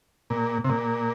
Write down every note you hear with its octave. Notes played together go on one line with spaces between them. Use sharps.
A#2
C3
A#2